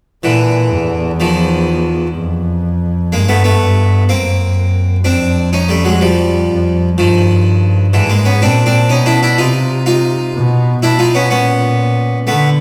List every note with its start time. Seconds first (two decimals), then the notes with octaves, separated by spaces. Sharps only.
0.23 A#2 D3 E3
0.71 E2
1.20 D#3 F3
2.16 F2
3.12 G2 G#3 A#3
3.28 A3 B3
3.44 A3 B3
3.60 G2
4.09 F#2 A#3 C4
5.04 F2 C4 D4
5.53 C#4 D#4
5.69 G3 A3
5.85 F#3 G#3
6.01 F3 G3
6.50 F2
6.97 G2 D#3 F3
7.93 G#2 D3 E3
8.10 G#3 A#3
8.25 B3 C#4
8.42 A#2 C4 D4
8.66 C4 D4
8.90 B2 C#4 D#4
9.06 D4 E4
9.23 D4 E4
9.38 C3 D#4 F4
9.86 D#4 F4
10.34 B2
10.82 B2 D4 E4
10.99 D#4 F4
11.15 B3 C#4
11.31 A#2 B3 C#4
12.27 D3 A3 B3